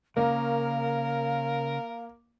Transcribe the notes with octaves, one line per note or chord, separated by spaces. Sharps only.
C#3 A#3 A#4 F5